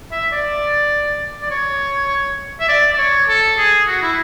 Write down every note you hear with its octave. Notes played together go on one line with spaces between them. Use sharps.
E5
D5
D5
C#5
E5
D5
D5
C#5
A4
G#4
F#4
E4